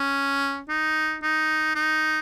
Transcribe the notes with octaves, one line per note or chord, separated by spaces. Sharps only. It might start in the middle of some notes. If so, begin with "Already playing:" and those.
Already playing: C#4
D#4
D#4
D#4